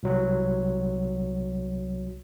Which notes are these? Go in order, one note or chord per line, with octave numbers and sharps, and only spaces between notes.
C2 F#3